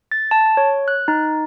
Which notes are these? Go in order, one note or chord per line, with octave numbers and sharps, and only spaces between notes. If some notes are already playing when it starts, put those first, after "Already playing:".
A6
A5
C#5
F#6
D#4